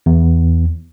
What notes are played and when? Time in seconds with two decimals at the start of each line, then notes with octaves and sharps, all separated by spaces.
0.06 E2